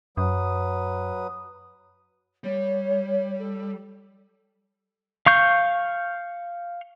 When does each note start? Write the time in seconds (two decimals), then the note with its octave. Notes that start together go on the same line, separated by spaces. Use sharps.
0.17 F#2 F#3 B4 D#6
2.44 G3 C#5
3.39 A4
5.26 F5 C#6 G6